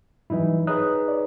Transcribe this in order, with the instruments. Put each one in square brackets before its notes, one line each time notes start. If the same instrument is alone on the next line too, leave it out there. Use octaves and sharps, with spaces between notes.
[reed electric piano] G#2 F#3 D#4 [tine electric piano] E3 G3 E4
[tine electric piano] D#4 G#4 B4 [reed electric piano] C#5 D#6 F#6
[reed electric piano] C#5 D5